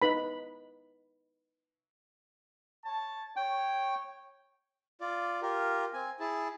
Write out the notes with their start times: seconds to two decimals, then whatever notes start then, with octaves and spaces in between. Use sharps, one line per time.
0.02 D#4 B4 B5
2.85 C#5 A5
3.36 C#5 G5
5.01 F4 D5
5.42 F4 G4 A#4
5.94 C4 G#5
6.20 E4 G#4 A5